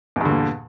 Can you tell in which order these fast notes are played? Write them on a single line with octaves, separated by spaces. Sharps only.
E2 G2 D3 A#2